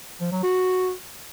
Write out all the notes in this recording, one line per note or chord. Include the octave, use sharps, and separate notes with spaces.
F3
F#3
F#4